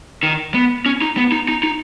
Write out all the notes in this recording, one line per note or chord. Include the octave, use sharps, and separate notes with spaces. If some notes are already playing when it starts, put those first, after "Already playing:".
D#3
B3
C#4
D#4
B3
D#4
D#4
D#4